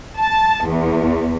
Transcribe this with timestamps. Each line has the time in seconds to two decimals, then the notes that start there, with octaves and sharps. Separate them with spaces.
0.16 A5
0.67 E2